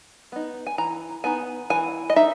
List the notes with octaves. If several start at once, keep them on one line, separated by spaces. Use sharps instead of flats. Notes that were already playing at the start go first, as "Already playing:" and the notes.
B3 D#4
G#5
E3 A#5
B3 D#4 G#5
E3 G#5
D#5
D#4 E5